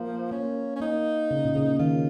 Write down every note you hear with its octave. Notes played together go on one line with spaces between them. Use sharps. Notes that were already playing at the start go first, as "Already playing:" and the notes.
Already playing: F3 A#3
A#3 C#4
C#4
A#3 D#4
C#3
A#2
C#3
D#3 F4